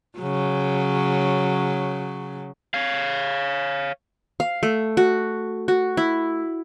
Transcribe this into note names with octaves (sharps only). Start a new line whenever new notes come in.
C#3 F#3
C#5 F5
F5
A3
F#4
F#4
E4